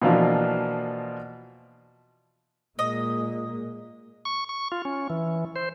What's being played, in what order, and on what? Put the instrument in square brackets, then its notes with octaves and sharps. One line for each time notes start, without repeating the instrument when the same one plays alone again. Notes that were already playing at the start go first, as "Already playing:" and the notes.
[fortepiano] B2 E3 F3 A#3 D4 F4
[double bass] A#2 G#3 [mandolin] D#5
[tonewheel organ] C#6
C#6
F4
C#4
E3
C5